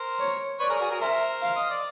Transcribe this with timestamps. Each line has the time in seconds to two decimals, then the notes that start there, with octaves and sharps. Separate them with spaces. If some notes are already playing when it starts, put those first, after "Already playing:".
Already playing: A#4 C5
0.19 C#5
0.59 B4 C#5 D5
0.70 G#4 A#4
0.81 F#4 G#4
0.91 G#4 A#4
1.01 A#4 C5 E5
1.42 F5
1.56 D#5
1.70 D5